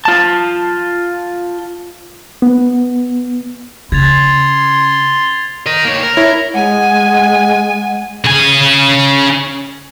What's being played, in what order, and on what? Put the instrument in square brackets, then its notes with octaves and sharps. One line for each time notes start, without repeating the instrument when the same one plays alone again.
[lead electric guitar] F4 A5
[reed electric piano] B3
[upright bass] C#3 [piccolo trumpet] C6 [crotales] G#6 A6 F7
[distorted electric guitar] A#4 D#5
A#3 C#5
A#4
[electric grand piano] E4 C#5
[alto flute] G#3 [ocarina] F#5 [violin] G#5
[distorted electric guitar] C#3 G#5